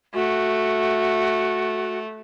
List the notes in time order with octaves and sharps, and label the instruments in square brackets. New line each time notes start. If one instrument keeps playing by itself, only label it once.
[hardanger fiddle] A3 [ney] F#4